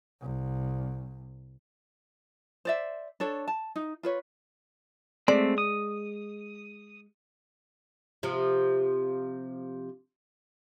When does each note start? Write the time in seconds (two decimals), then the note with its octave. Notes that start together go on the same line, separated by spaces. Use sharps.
0.22 C2
2.65 C5 D5 E5
3.20 D4 A4 C#5
3.48 A5
3.76 D#4
4.03 F4 B4 C#5
5.28 G#3 A3 C4 D5
5.58 D#6
8.23 C3 F3